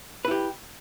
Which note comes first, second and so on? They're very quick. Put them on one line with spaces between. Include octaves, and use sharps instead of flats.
B4 E4 G4